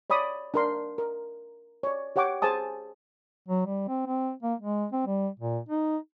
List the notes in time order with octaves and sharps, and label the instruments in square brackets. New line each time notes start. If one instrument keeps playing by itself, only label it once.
[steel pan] C#5 D5 B5 D#6
D4 A#4 C6
A#4
C#5 D5
G4 C#5 F#5 G5 D6
G#4 C5 G#5 A5 D#6
[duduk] F#3
G3
C4
C4
A#3
G#3
C4
G3
A#2
D#4